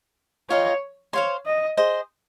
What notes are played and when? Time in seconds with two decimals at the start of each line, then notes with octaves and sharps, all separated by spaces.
0.50 F4 A#4 C#5 D#5 G5
1.13 C5 C#5 F5 C6
1.46 D#5
1.77 G#4 C5 D#5